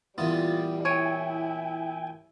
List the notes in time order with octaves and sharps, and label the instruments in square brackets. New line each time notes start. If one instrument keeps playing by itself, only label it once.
[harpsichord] A#2 E3 B3 [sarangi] G3 [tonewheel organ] F4 A6
[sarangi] E4 [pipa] C#5 [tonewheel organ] G5 G#5